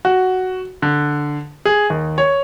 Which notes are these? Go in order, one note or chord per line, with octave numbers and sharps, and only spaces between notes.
F#4
D3
G#4
D#2
C#5